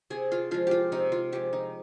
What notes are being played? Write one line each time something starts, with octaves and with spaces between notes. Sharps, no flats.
C3 G#4
F4
F3 G#3 F4
F4 G4
C3 D#4
F4
F3 G#3 G4
D#4